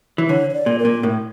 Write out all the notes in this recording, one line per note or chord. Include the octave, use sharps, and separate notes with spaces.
E3
D3 C#5
C#5
D5
A#2
A#4
A#2
A2